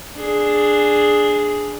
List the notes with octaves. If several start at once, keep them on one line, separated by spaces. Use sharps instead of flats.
D4 G#4